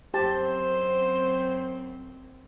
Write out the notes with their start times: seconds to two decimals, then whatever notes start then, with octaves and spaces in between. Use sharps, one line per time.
0.14 F#2 C4 G4 C5 A5